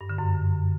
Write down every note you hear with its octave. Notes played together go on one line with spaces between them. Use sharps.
G2
D3
F#2